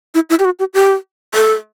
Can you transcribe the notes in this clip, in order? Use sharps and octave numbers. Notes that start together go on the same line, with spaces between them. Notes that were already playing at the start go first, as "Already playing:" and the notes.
E4
E4
G4
F#4
G4
G4
A4